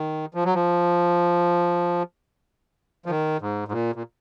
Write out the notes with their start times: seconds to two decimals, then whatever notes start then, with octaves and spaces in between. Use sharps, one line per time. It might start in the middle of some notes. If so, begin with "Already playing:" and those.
Already playing: D#3
0.34 F3
0.45 F#3
0.55 F3
3.06 F3
3.10 D#3
3.41 G#2
3.68 G#2
3.72 A#2
3.95 A#2